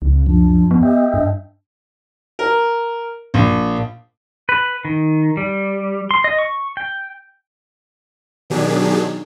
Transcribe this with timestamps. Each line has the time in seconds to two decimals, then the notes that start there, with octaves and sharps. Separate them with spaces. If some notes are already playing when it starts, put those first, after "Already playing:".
0.02 C#2 C#3
0.26 F#2 F3 D4
0.71 B3
0.83 G4 D#5 E5 G5
1.14 G2 D4
2.39 A#4
3.34 A#1
4.49 B4
4.85 D#3
5.37 G3
6.11 C6
6.24 D#5
6.39 C#6
6.77 G5
8.50 B2 D#3 F#3 D4 G4 G#4